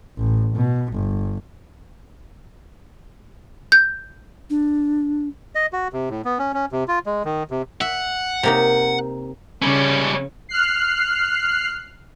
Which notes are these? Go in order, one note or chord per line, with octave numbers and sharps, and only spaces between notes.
A1
B2
G1
G6
D4
D#5
F#4
C3
A2
B3
C#4
C#4
C3
F4
G#3
D#3
C3
E5 F#5
C3 A#3 D#4
C#3 G3 C#4
F6 F#6 C7